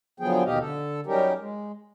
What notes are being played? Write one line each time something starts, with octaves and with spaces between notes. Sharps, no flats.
D3 F3 F#3 B3 G#4 G5
D#2 B2 D#3 G4 D#5 F5
D3 A4
F#3 G3 C#4 D#4 G4 A#4
G#3